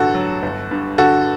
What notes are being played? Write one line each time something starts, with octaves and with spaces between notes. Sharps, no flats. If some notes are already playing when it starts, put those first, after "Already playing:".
Already playing: A1 G2 D3 F#4 A4
F#3
G1
G2
D3 F#4 A4